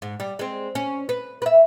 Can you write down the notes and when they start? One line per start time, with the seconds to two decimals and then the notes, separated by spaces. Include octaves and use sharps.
0.02 G#2
0.20 G3
0.39 G#3 C4
0.75 C#4
1.09 B4
1.42 B4 E5